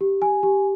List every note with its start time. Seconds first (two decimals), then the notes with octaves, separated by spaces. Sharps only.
0.01 G4
0.22 G#5
0.43 G4